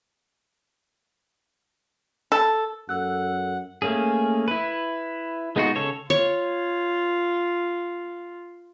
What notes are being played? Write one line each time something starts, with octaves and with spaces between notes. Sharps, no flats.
A4
F#2 A4 F#5 E6 F#6
A3 A#3 C#4 G#4
E4 B4
G#3 B3 D#4 F4 F#4
C#3 A4 C#5
F4 C#5